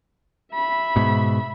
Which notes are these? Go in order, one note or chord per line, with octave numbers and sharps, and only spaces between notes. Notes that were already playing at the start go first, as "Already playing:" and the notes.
E5 B5
G#2 B2